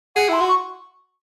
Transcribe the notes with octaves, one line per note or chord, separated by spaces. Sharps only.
G#4 F#5
E4 C6
F#4
C#6